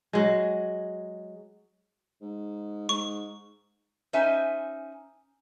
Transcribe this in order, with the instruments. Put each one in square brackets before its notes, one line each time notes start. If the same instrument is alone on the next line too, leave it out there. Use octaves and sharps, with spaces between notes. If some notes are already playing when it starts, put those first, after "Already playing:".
[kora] F#3 G#3
[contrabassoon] G#2
[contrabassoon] G#2 [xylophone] C#6
[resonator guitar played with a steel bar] C#4 D#4 C5 E5 G#5